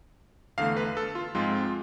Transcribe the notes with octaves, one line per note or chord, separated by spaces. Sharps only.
E2 D3 A3 F5
B4
A4
F4
G#2 F3 G#3 C4 F4